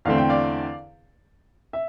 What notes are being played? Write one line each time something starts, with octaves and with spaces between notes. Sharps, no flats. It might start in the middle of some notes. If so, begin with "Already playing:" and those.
E2 D3 A3 C4 F5
G5
D5 F5
E5